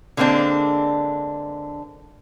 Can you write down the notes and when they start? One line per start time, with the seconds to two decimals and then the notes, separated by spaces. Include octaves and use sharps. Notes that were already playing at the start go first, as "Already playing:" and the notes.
0.17 D3 G#3 A#3 C4 D4